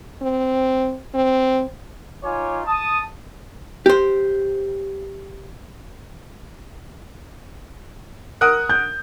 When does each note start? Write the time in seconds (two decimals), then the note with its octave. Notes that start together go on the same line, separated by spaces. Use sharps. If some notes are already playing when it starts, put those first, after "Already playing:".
0.22 C4
1.14 C4
2.23 D#4 F4 C#5 G#5 D6
2.66 A5 D#6
3.86 G4 C5
8.41 A#4 F#5 D#6 F#6
8.69 G6